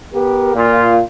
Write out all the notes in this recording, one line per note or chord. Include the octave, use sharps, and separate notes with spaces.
B3 G4 A#4
A#2 F4